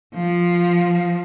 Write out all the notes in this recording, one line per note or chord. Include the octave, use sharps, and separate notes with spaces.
F3